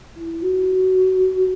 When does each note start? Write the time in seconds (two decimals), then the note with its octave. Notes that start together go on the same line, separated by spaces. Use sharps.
0.16 E4
0.42 F#4